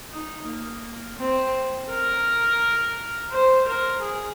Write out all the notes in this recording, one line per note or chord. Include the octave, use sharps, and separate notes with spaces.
D#4
A#3
C4
A#4
C5
A#4
G#4